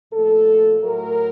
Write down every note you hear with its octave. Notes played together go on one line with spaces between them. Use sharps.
A#2 F3 A3 A4
A2 F#3 A3 A#4